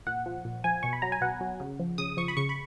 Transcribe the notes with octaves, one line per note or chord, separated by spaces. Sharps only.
A#2 F#5
F3
A#2
F3 G#5
B2 C#6
B5
F#3 A#5
G#5
B2 F#5
F#3
C#3
F3
C#3 D#6
F3 C#6
B5
C#3 C#6
B5